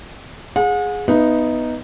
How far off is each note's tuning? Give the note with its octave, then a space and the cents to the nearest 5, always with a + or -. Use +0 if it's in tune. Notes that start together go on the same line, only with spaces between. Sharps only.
G#4 +0 F#5 -40
B3 +0 D#4 +0 E5 +30